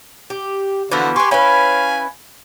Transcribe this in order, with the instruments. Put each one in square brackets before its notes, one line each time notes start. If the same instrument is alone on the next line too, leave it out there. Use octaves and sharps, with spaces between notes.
[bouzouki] G4
[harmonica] D3 F#4 [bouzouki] E3 F3 B3
[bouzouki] G4 B4 [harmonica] G#5 C6 C#6
[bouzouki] C#4 E4 B4 [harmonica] F5 G#5 B5